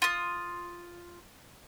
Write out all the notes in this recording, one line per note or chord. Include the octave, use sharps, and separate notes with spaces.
F4 D#6